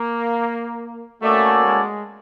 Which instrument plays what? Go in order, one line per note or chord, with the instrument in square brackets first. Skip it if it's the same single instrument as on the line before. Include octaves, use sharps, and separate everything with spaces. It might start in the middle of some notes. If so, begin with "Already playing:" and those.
Already playing: [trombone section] A#3
[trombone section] A3 [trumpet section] A#3 C#4 F#4 A4 D5
[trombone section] G#3